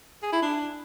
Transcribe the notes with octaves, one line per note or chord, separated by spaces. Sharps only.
G#4
E4
D4